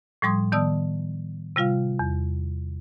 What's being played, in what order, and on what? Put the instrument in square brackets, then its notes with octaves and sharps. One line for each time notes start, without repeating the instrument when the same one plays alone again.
[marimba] A2 F3 G3 C6 D#6 G#6
D#3 B3 D5 A5 D#6 E6
C3 G3 F4 F5
E2